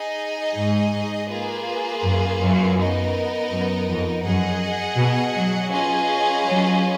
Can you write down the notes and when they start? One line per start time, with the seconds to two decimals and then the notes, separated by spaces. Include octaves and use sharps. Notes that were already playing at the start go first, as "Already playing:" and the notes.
Already playing: D#4 G#4 D#5
0.56 G#2
1.30 A#3 F4 G#4 B4
2.03 F#2
2.40 F#2
2.77 B3 D#4 A#4 D#5
3.51 F#2
3.87 F2
4.25 F#2 G#4 D#5 F#5
4.98 B2
5.36 F#3
5.72 C#4 F4 G#4 B4 D#5
6.45 F#3